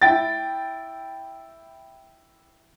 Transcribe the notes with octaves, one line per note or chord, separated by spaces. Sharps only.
E4 G5 A6